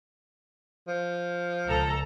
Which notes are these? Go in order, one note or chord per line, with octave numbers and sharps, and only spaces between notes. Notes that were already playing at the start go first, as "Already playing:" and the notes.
F3
C#2 A4 A#5